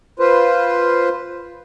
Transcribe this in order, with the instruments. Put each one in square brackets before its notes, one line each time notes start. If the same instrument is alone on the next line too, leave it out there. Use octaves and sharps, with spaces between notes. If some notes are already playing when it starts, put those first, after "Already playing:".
[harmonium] F4 B4 C5